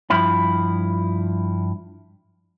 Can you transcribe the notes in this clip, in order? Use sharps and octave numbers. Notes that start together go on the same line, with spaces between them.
G2 F3 E4 B5